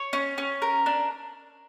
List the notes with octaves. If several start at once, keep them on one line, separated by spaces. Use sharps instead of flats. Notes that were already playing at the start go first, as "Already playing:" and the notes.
Already playing: C#5
C#4
C#4
A#4
D4